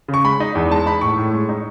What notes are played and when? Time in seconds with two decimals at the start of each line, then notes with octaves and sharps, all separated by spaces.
0.08 C#3
0.14 C#6
0.24 G#3 B5
0.40 D#4
0.55 E2
0.71 G#3 A5
0.86 D#4 B5
1.01 A2 C#6
1.18 A2
1.33 G#3
1.49 D#4